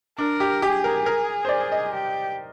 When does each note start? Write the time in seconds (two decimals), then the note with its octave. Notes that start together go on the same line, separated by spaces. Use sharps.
0.18 D4 A#4
0.40 G4
0.62 G4 G#4
0.84 A#4
1.06 A#4
1.45 C5
1.49 D5
1.72 D#5
1.93 G4